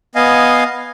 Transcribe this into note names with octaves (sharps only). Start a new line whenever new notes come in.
B3 D#5 F5 G#5